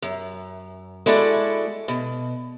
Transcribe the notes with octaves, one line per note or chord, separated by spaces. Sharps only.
F#2
G#3 E4 F#4 A4 D5
B2